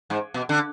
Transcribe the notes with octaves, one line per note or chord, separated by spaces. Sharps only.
G#2
B2
D3